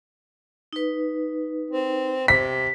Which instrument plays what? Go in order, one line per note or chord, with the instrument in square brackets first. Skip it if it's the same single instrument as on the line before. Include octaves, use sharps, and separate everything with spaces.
[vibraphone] D#4 B4
[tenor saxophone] C4
[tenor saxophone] C3 [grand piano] B6